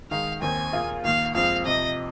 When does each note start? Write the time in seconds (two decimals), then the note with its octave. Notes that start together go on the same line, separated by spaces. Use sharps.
0.11 D#3 G#3 D#4 G#4 F5
0.41 D#2 D#3 C4 G#5
0.72 A#2 A#3 F4 G#4
1.04 D#2 D#3 A#3 F5
1.35 F2 F3 G#3 C4 F5
1.65 F2 C3 F3 D#5